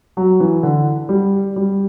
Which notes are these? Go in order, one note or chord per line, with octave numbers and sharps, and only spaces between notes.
F#3
E3
D3
G3
G3